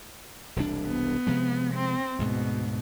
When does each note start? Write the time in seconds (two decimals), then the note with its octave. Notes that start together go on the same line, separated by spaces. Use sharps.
0.56 E1 C2 D4
0.87 B3
1.27 C3 F3 G#3
1.74 C4
2.19 D2 G#2 B2